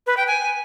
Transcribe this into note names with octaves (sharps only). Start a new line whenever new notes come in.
B4
G5
G#5